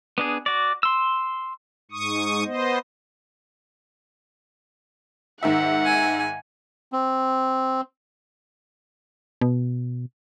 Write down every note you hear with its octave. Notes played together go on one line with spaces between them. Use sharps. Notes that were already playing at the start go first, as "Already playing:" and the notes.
B3 D4 G#4
F#4 D5
C6 E6
G#2 C#6 D#6
B3 C5 D#5
G#2 D#3 E5 F#5
G#5
C4
B2